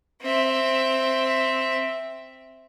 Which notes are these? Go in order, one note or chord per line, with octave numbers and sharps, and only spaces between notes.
C4 E5